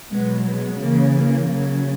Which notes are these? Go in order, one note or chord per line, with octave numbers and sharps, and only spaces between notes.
B2 F#3 G#3 B3
G#3 B3
C#3 E3 A#3
A#3
C#3 F#3